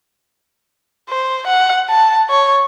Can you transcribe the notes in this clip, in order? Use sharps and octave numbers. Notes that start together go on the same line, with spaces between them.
C5
F#5
A5
C#5